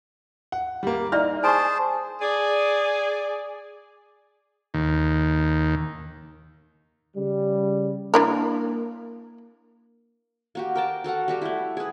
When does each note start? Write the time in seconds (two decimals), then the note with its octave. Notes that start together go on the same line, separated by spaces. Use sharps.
0.52 F#5
0.83 G3 A#3
1.12 D#4 E4 D5 E5 F6
1.44 G#4 C5 G#5 A5 C#6
2.21 G#4 D5
4.74 D#2
7.17 C#3 G3
8.14 A#3 D4 E4 A#4
10.55 A#3 F#4 G4
10.75 A#4 G5 A5
11.04 F#4 A4 F5 F#5
11.28 G3 F#4 G4
11.42 A3 E4
11.77 G#4 B4